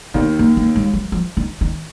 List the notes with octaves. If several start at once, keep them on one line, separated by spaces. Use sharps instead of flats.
D#2 D#3 B3
A#3
A#3
G#3
F#3
F3
D#3
D#3